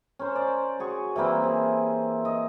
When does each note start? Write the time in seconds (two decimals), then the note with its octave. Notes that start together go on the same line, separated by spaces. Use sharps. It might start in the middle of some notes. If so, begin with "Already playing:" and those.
0.19 C#4 A#4 C5
0.35 D5
0.79 F#4 G#4 C#6
1.16 E3 G3 A#3 C4
1.44 G#4
2.25 D#5